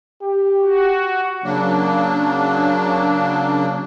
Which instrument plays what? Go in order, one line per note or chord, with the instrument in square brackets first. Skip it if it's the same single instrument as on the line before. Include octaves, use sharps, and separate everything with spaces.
[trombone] G4
[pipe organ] F#4
[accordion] C#3 F#3 A#3 D4